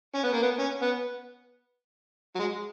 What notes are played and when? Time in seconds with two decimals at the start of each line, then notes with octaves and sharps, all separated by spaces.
0.15 C#4
0.24 B3
0.33 A#3
0.42 B3
0.59 C#4
0.82 B3
2.35 F#3
2.39 G#3